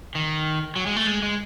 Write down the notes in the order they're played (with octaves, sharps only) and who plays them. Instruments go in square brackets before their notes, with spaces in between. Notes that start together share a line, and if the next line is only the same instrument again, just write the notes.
[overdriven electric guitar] D#3
F#3
G#3
A3
G#3
G#3